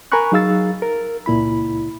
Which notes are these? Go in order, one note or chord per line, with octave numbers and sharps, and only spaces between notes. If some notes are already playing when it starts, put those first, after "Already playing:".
A#4 G#5 A#5 B5 C#6 F#6
F#3 D#4 G#4 F5 E6 A6
A#4
C#2 A#2 E4 B5